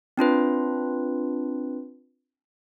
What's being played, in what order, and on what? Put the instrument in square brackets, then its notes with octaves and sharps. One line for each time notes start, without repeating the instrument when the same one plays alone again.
[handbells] C4 D4 F4 B4